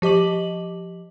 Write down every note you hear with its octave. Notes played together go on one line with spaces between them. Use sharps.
F3 G4 D#5 D6 F#7